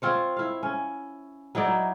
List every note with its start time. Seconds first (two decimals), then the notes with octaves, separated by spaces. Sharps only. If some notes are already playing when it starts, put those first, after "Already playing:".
0.02 C4 F4 C#5
0.36 E4 F5
0.63 C#4
1.55 F#3 D#4 E4 D5